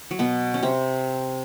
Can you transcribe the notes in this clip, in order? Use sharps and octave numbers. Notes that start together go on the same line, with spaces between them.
F#3
B2 B3
C#4
C3 C4